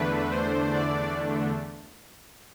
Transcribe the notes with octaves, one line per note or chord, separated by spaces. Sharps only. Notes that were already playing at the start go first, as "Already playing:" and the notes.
Already playing: E2 D3 A3 D4 B4
C5
D5